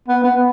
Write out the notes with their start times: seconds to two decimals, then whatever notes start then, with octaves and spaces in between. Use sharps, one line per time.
0.08 B3
0.24 B3